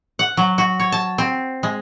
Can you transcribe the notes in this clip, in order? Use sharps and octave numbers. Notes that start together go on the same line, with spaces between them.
F#5
F#3
F#4
C#5
A5
C4
G#3